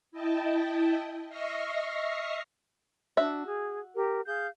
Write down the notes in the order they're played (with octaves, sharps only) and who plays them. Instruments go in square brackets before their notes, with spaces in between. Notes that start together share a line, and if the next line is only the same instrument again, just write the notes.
[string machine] E4 D#5 G5 A5
D#5 E5 C#6 F6 A#6 C7
[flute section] D4 [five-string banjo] F#4 E5
[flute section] G#4
G4 A#4
G#4 F5 G6